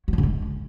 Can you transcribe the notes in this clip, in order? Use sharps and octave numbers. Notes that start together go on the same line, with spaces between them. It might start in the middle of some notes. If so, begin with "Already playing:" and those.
F#3
F3
C#3
G#3